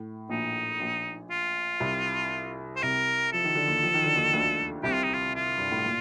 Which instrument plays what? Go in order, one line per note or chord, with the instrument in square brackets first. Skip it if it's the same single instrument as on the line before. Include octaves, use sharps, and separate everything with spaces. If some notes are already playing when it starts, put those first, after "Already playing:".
Already playing: [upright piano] A2
[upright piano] A#1 A#2 [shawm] D#4
[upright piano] A#1 A#2
[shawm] F4
[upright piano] C2 C3
[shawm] C5
[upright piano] C2 C3 [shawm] A#4
[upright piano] F3 [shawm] A4
[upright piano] D#3
D3
D#2 D#3
F3
D#3
D3
D#2 D#3
D2 D3
[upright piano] C2 C3 [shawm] G4
[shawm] F4
D#4
F4
F4
[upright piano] G2
A2
A#2